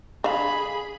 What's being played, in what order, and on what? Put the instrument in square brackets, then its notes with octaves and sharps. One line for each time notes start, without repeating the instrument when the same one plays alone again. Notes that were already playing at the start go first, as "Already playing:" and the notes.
[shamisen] D3 F5 [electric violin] G#4 B5